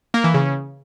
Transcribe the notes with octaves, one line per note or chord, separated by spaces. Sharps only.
A#3
E3
C#3